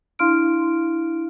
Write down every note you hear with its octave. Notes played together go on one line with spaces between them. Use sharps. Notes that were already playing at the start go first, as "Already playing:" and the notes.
D4 E4 F5 C6 F6 D7